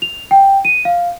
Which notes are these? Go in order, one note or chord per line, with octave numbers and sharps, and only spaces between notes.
F7
G5
D#7
F5